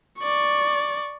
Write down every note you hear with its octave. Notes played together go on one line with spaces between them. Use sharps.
D5 C#6